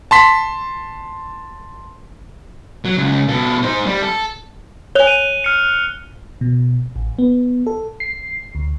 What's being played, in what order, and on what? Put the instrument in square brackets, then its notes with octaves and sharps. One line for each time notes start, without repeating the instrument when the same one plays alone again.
[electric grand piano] A5 C6 B6
[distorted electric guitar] F#3
C#2
B2 A4
D#4 C5
G3
A4
[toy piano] C#5 G#5 [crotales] F#6 F7 G7
[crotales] D#7
F6 C#7
[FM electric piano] B2
A1
B3
A4
C7
D2